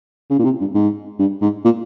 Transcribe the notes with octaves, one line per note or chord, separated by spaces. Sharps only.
C#3
A#2
C3
G2
G#2
G2
G#2
A#2